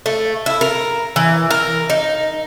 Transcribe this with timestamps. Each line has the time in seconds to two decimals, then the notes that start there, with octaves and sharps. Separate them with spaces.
0.06 A3
0.46 E4
0.61 A#4
1.16 E3
1.51 A#4
1.90 D#4